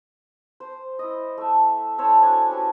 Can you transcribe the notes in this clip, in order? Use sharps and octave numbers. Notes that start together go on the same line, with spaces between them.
C5
E4 D#5
A3 E5
E4 A4 C5 C#5
D4 F#4 G#5 A5
C#4 F#4 G4 B4